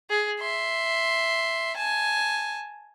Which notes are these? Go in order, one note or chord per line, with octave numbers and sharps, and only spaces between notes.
G#4
E5 C6
G#5 A5